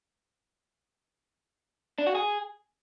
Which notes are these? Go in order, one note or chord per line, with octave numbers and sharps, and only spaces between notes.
D4
F#4
G#4